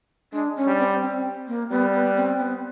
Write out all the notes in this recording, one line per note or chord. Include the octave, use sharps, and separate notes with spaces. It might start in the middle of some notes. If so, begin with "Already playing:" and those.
G#3 D4
C#4
G3
C4
C4
A#3
G3 B3
B3
C4
B3